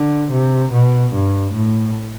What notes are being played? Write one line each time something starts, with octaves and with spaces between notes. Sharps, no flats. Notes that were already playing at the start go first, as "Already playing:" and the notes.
Already playing: D3
C3
B2
G2
A2